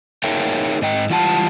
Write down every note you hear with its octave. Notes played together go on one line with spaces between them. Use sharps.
D#4 G#4 A#4 C#5 E5 G5
G#2 D#5 G5
E3 G3 F4 F#5 G#5 A5